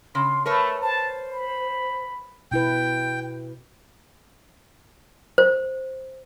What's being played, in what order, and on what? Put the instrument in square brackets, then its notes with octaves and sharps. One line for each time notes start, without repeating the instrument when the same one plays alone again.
[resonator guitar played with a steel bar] C#3 [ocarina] C6
[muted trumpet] A3 [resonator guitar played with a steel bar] A#4 B4 C#5 [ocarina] A5
[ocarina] C5 [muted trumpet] A5
[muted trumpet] B5
[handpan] B2 E4 B4 [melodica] G5
[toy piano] C5